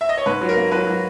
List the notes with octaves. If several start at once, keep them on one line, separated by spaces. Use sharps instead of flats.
E5
D#5
C#5
G#2 B4
F#3
A#4
A#3
F#3 B4
F#3